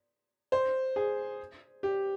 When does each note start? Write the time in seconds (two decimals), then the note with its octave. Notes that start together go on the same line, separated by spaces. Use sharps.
0.52 C5
0.96 G#4
1.83 G4